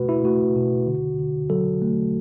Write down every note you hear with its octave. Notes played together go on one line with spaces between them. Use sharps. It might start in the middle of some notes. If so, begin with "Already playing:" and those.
Already playing: B2 A3 F#4 B4
E4
A3 F#4
B2
D3
D3
F#3 A4
A3